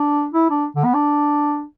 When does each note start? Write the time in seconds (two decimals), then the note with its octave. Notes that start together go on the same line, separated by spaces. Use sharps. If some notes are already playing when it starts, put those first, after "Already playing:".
Already playing: D4
0.34 E4
0.50 D4
0.76 D3
0.85 B3
0.94 D4